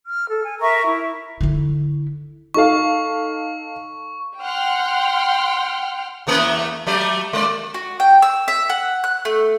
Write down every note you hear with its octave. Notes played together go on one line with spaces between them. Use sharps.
F6
A4
G#5
A#4 E5 A#5 C#6
E4
D3 E4
D#4 A4 F5 C#6
F#5 G5 C6 F6
E2 A3 A#3
F#3 A3 D5
G#3 D5
F#4
G5
E6
E5
F#5
F#6
A3